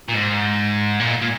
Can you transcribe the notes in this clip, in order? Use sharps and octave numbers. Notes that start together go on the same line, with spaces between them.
A#2
G#2
A#2
A#2